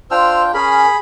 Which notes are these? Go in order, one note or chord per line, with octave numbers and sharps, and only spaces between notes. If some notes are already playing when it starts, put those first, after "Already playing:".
D4 F4 C5 G5 E6 F6
C#4 G#4 A#4 B5